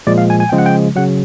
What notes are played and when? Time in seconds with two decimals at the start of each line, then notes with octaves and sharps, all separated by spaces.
0.07 A#2 F3 G#3 D5
0.18 F5
0.30 G#5
0.40 G#5
0.49 C#3 F3 G#3 G5
0.58 F#5
0.66 G5
0.96 C#3 F#3 F#5